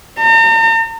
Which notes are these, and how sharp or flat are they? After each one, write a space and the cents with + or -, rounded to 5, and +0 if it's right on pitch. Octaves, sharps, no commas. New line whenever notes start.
A#5 -45